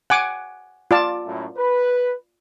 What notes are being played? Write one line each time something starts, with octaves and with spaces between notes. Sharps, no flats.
F#5 G#5 D6
F4 D5 A5
F#2 A2
B4